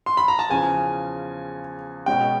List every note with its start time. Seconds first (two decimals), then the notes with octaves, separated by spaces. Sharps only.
0.06 C6
0.17 B5
0.28 A#5
0.39 A5
0.49 E2 C#3 F3 G#5
2.06 B2 G#3 C#4 G5